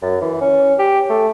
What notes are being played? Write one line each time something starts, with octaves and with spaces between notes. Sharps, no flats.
F#2
E3
C#4
G4
A3